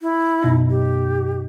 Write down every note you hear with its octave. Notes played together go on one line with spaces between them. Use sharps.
E4
F#2 B2 D#4
G4